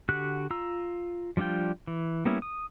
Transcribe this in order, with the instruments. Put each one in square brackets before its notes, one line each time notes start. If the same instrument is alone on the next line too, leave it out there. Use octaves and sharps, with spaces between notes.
[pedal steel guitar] D3 F#4 G4 F#6
F4 A#5 E6
F3 G3 D4 F4 G5
E3
G3 A#3 B3 C#4 E4
D#6